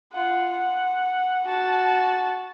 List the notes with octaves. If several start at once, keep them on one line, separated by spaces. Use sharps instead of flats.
F4 F#5
F#5
F#4 A5